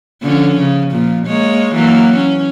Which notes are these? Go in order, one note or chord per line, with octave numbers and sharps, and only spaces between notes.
D3 F3 C#4
C#3
A#2 F3
G#3 A#3 C#5
E3 F#3 A#3
C#4